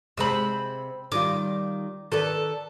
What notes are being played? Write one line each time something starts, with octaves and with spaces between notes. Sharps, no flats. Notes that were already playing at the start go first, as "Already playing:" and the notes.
C3 G#3 C4 B5 E6
D#3 G3 F4 D6
D#3 A4 B4 D5